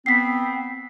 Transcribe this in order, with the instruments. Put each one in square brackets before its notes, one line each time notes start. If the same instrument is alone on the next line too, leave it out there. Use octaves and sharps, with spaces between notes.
[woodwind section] B3 C4 [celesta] B6 C7